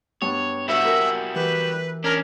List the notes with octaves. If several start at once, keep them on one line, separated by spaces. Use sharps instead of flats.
G2 B3 C#5 A5
G3 E4 F#4 B4 C#5 E5 F#5
A#4 G#5
E3 G4 B4 G6
C#4 D4 A#4